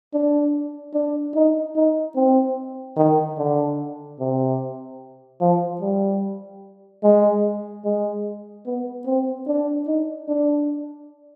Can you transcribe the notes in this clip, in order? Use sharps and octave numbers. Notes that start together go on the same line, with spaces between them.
D4
D4
D#4
D#4
C4
D#3
D3
C3
F3
G3
G#3
G#3
B3
C4
D4
D#4
D4